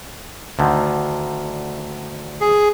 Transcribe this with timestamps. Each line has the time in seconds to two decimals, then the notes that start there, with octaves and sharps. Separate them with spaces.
0.59 D2 D3 D#3
2.41 G#4